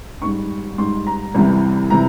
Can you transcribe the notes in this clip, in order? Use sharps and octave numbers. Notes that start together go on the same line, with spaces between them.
G#2 G3 C#6
G#2 G3 C6
A#5
C2 C3 E3 G3
C3 E3 G3 A#5